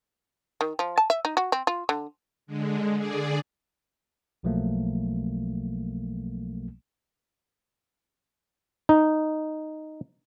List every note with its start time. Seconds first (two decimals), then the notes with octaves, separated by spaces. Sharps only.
0.61 D#3
0.79 F3
0.98 A5
1.10 E5
1.25 D#4
1.37 F#4
1.52 C4
1.67 F4
1.89 D3
2.47 D3 G#3
2.96 D3 G#4 D5
4.43 B1 B2 F3 F#3 A3 A#3
8.89 D#4